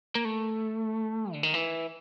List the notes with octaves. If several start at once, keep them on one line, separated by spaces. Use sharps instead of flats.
A#3
A3
D3
D#3
E3